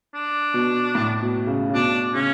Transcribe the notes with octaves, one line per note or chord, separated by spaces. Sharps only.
D4
B2
A2
B2
C#3
C#3
B2 D4
C#3 C#4